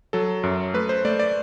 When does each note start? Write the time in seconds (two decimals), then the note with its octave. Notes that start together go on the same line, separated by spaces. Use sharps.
0.13 F#3 A4
0.43 F#2
0.74 A3 B4
0.89 C5
1.05 A3 D5
1.19 D5